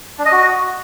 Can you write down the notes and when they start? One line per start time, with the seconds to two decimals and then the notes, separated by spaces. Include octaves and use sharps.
0.19 D4
0.25 D#5
0.32 F#4